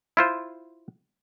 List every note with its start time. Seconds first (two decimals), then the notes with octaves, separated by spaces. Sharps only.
0.17 E4 F4 C5